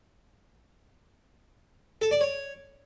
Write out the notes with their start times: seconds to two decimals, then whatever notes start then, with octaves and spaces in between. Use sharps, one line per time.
2.02 A4
2.11 D5
2.21 C#5